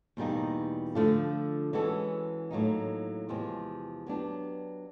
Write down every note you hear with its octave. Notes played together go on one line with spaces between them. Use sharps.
E2 B2 G3 A#3 D#4
D3 F3 A3 D4 F4
E3 G#3 C#4 F#4 A4
A2 F#3 A#3 D#4
E2 C3 F3 G#3 C4
F#3 B3 D4 G4